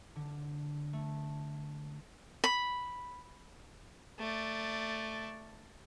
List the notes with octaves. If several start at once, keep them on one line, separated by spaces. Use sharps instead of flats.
D3
A3
B5
A3 D5